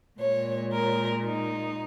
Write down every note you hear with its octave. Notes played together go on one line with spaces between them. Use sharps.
A#2 G#3 C#5
A#4
D#4